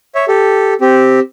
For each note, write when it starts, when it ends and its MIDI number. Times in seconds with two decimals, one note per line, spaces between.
0.15 0.25 73
0.15 0.25 76
0.28 0.74 67
0.28 0.74 69
0.81 1.20 60
0.81 1.20 67